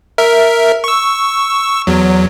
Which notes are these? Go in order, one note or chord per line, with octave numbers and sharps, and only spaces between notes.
A#4 E5
C#6 E6
E2 F#3